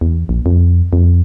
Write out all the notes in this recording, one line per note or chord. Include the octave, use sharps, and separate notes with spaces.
E2
A#1
F2
F2